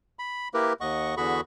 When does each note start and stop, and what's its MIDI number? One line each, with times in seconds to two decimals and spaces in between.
0.19 0.48 83
0.54 0.73 58
0.54 0.73 64
0.54 0.73 67
0.54 0.73 70
0.54 0.73 71
0.81 1.15 39
0.81 1.15 75
0.81 1.15 78
0.81 1.15 85
1.17 1.41 40
1.17 1.41 50
1.17 1.41 66
1.17 1.41 68
1.17 1.41 83
1.17 1.41 85